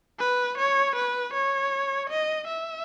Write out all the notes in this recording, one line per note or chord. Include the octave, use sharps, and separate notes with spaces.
B4
C#5
B4
C#5
D#5
E5